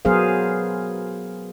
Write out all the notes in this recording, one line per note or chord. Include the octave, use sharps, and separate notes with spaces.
F#3 B3 G#4 A#4 C5 F5